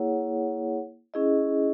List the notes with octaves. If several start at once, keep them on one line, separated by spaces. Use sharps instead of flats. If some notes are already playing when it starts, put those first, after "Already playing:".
Already playing: A#3 E4 G#4 C#5 F#5
C#4 E4 G#4 D#5